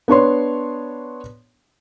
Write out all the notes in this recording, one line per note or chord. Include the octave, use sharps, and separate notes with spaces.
B3 D4 C#5 C6